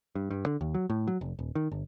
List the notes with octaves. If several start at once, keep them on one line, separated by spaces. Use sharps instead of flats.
G2
G2
D3
D#2
F#3
A2
F#3
F1
D#1
D#3
G1